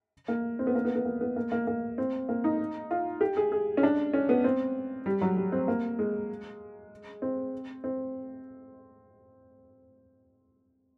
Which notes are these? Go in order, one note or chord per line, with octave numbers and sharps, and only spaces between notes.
A#3
C4
B3
A#3
B3
B3
A#3
B3
A#3
A#3
A#3
C4
A#3
D#4
F4
G4
G#4
G#4
C#4
D4
C#4
B3
C4
G3
F#3
G3
C4
A#3
G#3
C4
C4